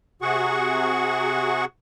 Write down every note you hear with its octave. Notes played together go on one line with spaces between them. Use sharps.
C3 F#4 G#4 F#5 C#6